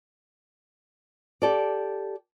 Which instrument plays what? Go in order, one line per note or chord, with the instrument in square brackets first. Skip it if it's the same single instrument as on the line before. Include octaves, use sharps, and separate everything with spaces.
[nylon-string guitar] G4 A4 D5